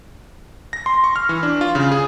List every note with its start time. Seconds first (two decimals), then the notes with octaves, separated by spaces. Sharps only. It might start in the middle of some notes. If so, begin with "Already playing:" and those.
0.73 A#6
0.86 C6
1.04 C#6
1.16 F6
1.29 E3
1.43 D4
1.61 F4
1.75 C#3
1.92 G#4